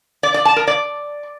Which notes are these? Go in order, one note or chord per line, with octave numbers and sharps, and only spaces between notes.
D5
D5
A5
A#4
D5